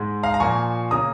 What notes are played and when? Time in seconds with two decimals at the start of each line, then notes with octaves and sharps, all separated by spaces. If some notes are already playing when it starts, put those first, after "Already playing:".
Already playing: G#2 G#3
0.23 F5 A#5
0.34 A#5
0.40 A#2 F3 A#3 G#5 C#6
0.91 C#3 A#3 A#5 D#6